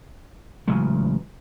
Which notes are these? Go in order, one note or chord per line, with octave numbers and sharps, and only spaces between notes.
A1 C#3 F#3 G#3